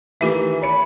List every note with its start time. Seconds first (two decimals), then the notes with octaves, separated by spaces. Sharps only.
0.21 D#3 E3 A3 F4 G4 E5
0.62 C#5 B5 C#7